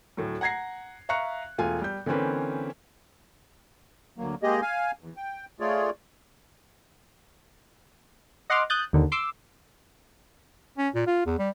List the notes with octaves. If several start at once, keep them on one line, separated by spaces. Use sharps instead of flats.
D2 A2 F#3
F#5 A#5 G#6 A#6 C7
E5 F5 A#5 C#6 F#6 C#7
E1 A3 F4 G#5
G3 G6
D3 E3 A#3 C4 C#4 B4
D2 F#3 A#3
G#3 A#3 G4 G#4 D#5
F5 G#5
E2
G5
A3 F4 G#4 C#5 D5
D#5 F#5 C6 D6 F6 C7
D#6 F#6 G6 A6
D#2 D3 D#3
C6 D6 E6
C#4
A#2
F4
E2
G3